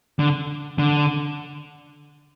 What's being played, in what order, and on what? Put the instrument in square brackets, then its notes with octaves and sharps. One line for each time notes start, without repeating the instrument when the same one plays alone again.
[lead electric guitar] D3
D3